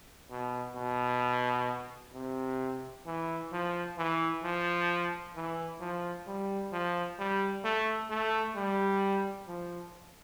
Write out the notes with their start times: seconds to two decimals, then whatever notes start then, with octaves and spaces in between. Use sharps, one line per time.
0.30 B2
0.76 B2
2.14 C3
3.06 E3
3.52 F3
3.97 E3
4.43 F3
5.36 E3
5.80 F3
6.27 G3
6.72 F3
7.19 G3
7.65 A3
8.10 A3
8.55 G3
9.48 F3